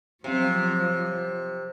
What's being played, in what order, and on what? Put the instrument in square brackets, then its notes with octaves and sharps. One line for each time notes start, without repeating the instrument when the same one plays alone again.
[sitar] C3 [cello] F3 F#3 [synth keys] C4 F5